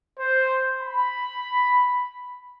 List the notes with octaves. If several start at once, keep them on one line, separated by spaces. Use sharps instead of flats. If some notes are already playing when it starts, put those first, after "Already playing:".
C5
B5